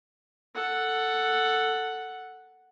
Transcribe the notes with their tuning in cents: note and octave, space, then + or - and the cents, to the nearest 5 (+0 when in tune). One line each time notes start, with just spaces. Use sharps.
A4 +10 F#5 +0